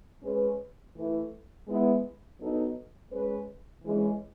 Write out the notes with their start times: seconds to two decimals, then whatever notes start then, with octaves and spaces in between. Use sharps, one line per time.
0.23 G#3 C#4 G#4 B4
0.95 E3 A3 E4 B4
1.67 G#3 B3 E4
2.39 F#3 B3 D#4 A4
3.11 G#3 C#4 G#4 B4
3.84 E3 G#3 C#4